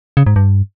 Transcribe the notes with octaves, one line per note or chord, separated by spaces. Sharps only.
C#3
G#2
G2